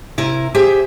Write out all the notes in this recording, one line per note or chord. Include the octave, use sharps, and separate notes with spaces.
C3 E4 A#4
G4 G#4 C5 E5